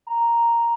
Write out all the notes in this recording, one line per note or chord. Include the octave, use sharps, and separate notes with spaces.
A#5